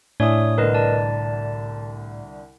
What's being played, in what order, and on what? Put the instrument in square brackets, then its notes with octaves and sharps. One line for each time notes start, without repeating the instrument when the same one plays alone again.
[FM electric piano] A2 [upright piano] D4 E4 G#5 [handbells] C#5 D#6
[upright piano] C2 D3 [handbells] A#4 B4 D#5
[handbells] D5 A5